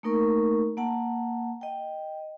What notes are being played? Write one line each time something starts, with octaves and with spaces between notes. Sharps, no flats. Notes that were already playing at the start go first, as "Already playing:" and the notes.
A3 A#3 D#4 A#4 C#6
A#3 F#5 A5
D#5 G5